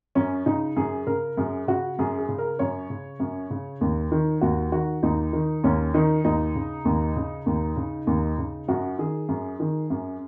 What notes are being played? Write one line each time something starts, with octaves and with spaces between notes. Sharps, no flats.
F#2 C#4
C#3 D#4
F#2 G#4
C#3 A#4
F#2 G#4
C#3 F#4
F#2 G#4
G#4
C#3
A#4
F#2 C#5
C#3
F#2
C#3
D#2
D#3
D#2 F#4
D#3 F#4
D#2 D#4
D#3
D#2 C#4
D#3 D#4
D#2 D#4
C#3
D#2
C#3
D#2
C#3
D#2
C#3
F#2 F#4
D#3 G#4
F#2
D#3
F#2